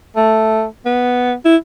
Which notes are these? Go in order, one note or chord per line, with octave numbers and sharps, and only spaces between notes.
A3
B3
E4